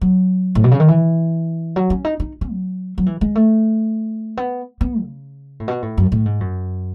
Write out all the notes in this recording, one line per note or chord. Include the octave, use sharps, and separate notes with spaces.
F#3
A2
B2
C#3
D#3
E3
F#3
C#4
D#4
D#4
C#4
F#3
F#3
E3
G#3
A3
B3
B3
C#3
A2
B2
A2
F#2
A2
G#2
F#2